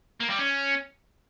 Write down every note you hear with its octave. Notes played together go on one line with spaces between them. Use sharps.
A#3
G3
C#4